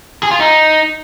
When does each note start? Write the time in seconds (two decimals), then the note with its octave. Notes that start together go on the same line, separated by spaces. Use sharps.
0.23 G#4
0.31 F4
0.40 D#4